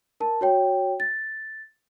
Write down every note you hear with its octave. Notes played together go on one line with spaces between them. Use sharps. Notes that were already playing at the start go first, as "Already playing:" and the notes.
A#4 A5
F#4 C#5 G5
A6